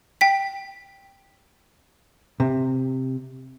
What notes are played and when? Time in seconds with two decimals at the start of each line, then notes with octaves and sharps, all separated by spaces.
0.21 G5 B6
2.40 C3